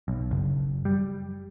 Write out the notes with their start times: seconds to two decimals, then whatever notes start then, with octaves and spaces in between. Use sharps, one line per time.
0.08 B1
0.31 F#1
0.85 G3